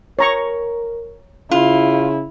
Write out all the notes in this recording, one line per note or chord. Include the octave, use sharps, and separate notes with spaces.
A#4 C#5 A#5 C#6
C#3 E4 F4